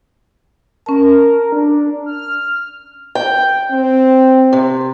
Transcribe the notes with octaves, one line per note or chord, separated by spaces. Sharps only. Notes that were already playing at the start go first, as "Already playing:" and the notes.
C#4 A#4 A5
D4
F6
G5
C4
C3